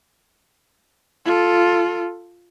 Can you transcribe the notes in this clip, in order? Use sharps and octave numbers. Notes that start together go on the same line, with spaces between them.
F4 A4